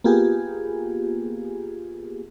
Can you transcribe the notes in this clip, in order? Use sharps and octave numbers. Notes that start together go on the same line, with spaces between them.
A#3 B3 F4 G4 G#4